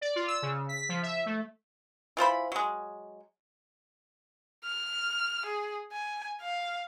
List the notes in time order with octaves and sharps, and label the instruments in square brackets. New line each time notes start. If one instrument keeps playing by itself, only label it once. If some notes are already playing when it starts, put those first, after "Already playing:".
[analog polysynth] D5
F4
E6
C#3
B6
F3
E5
A3
[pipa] E3 F4 C5 B5
F#3 G#3
[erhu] F6
G#4
G#5
F5